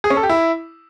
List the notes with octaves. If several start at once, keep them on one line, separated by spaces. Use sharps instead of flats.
G#4
C#4
A4
G4
E4